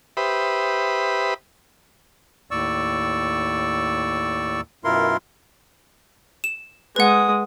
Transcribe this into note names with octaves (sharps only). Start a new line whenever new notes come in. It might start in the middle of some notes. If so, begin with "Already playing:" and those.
G4 B4 C5 E5 B5 D#6
D#2 A2 D5 C#6 E6
F#2 B2 E4 F4 A#4 C6
E7
G#3 B4 F#5 D#6